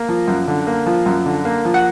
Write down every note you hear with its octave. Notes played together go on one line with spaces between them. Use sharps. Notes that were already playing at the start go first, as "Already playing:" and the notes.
Already playing: A#3
F3
F#2
D3
A#3
F3
F#2
D3
A#3
F3
F#5